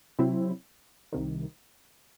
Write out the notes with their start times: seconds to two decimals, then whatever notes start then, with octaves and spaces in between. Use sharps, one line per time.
0.19 C3 F#3 C4 E4
1.12 C2 C3 D#3